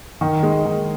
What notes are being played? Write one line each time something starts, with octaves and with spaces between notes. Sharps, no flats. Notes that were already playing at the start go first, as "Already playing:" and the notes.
D#3
G#3
D#3